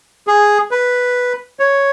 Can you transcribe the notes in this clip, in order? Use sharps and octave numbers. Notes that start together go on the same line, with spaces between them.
G#4
B4
C#5